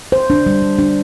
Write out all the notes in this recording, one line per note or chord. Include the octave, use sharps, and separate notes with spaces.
C5
D4
G3
G3
D4